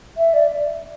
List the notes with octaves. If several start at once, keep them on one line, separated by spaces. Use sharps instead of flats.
E5
D5